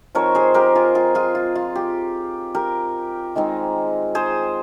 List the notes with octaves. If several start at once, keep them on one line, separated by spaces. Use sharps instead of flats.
F3 C4 D#4 A#4 C#5
G#4 C5
G4 A#4
F4 G#4
F4 G#4
F4 G#4
F4
F4
G4
G4 A#4
D#3 G#3 C4 D#4
G#4 C5